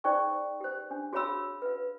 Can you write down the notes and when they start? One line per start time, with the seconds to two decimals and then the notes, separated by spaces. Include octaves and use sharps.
0.04 D#4 G#4 C5 D5 G5 C#6
0.61 G4 C5
0.91 D4
1.13 F#4 G#4 C#5 F5 B5 E6
1.62 B4 F5